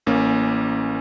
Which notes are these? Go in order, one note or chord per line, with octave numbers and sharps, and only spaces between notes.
A1 A#3 C#4